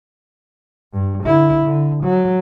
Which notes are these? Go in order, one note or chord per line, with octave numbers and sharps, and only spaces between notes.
G2
D3 E4
D3
F#3